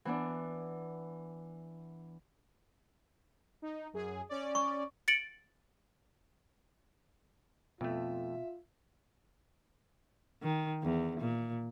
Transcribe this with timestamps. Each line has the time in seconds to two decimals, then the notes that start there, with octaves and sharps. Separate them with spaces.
0.05 E3 B3 D4
3.62 D#4
3.93 F#2 G#4
4.29 C#4 D5
4.55 C#6
5.08 A6 C#7 D7 F#7
7.81 F2 B2 A3 F4 E5
10.42 D#3
10.83 E2
11.20 A#2